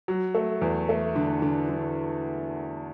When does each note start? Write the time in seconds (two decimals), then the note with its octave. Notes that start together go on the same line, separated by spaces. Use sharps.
0.08 F#3
0.35 A3
0.62 E2
0.89 A3
1.16 D3
1.42 D3
1.69 D3